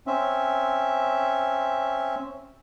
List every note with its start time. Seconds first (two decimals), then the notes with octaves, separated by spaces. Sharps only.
0.07 C4 C#4 E5